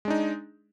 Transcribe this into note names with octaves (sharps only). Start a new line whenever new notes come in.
G#3 D4 D#4